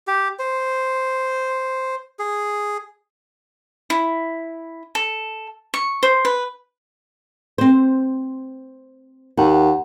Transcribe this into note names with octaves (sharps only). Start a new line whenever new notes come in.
G4
C5
G#4
E4
A4
C#6
C5
B4
C4 C5
D#2 F#5